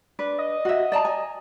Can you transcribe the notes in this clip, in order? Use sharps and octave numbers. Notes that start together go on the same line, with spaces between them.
D4 B4 D5
D#5
F#4 E5
D5 A5 A#5
G#5